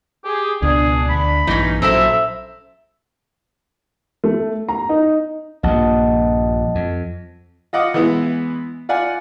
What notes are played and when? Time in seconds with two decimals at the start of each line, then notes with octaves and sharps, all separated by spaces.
0.25 G4 G#4
0.62 C#2 B2 D4 G#4
1.10 D2 B5
1.47 A#1 G2 E3 C#4 D#4
1.82 A#1 F#3 C#4 E4 A4 A#4 C5 E5
4.24 A3
4.69 A#5
4.89 D#4
5.63 A#1 G2 A#2 D#5 F#5 A5
6.75 F2
7.73 F4 D#5 F#5 D6
7.94 E3 G#3 B3 E4
8.89 F4 D5 F#5 G#5